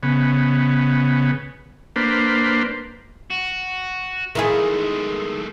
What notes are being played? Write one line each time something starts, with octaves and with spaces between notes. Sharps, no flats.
C#3 B3
A#3 D4 B4 C5
F#4
D#3 G#3 A3 E4 G#4